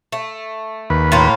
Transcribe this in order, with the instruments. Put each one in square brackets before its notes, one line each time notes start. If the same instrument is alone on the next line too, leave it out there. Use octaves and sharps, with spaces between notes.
[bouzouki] A3
[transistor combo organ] D#2 B4
[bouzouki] A2 A#3 F4